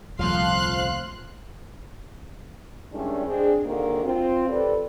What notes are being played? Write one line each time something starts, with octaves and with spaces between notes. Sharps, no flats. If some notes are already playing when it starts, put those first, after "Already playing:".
D#1 C2 F3 A3 F5 C6 F#6
D#3 G3 G#3 C#4 D4 E4
G#3 C4 D4 G#4
D#2 G#2 D3 D#3 A#3 F#4
C4 F4
C4 G4 A4 B4 D5